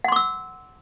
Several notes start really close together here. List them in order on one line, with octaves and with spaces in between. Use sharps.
F#5 C6 D6 E6